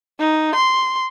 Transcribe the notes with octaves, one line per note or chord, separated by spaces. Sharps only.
D#4
C6